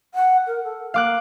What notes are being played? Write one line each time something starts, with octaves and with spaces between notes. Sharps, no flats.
F#5
A#4
A4
A#3 F5 D6 F#6